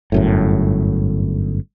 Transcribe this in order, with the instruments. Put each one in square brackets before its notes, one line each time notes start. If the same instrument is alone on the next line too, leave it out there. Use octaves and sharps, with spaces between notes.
[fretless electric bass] G1 F#2 A2